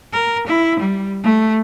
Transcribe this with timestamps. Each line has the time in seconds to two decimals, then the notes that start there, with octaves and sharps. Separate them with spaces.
0.13 A#4
0.47 E4
0.79 G3
1.23 A3